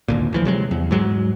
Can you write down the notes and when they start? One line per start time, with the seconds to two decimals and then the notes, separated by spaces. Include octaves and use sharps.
0.08 G#1 D2 A#2
0.33 D2 E3 F3
0.45 C3 F#3 G#3
0.71 E2
0.91 G#2 F#3 G#3